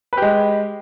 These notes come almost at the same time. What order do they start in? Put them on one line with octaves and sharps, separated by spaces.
B4 G4 G#3